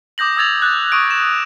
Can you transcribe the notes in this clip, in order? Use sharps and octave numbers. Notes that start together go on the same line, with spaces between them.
D6 D#6 G6 A#6 F#7
D#6 E6 G#6 A6 F7
F#6 G6 A6
C#6 D#6 F#6 D7
E7